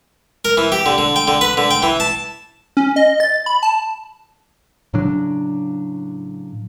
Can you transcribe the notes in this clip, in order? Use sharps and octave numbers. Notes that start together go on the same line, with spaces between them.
A#4
E3
G4
D3
D3
G5
D3
B4
D3
G5
E3
A5
C#4
D#5
A6
B5
A5
A2 C#3 F#3 D4